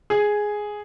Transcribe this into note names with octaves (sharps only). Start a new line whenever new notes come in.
G#4